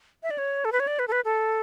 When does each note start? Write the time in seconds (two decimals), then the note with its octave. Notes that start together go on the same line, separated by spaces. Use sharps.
0.23 E5
0.30 D5
0.38 C#5
0.65 A4
0.72 B4
0.80 C#5
0.87 D5
0.99 B4
1.08 A4
1.12 B4
1.25 A4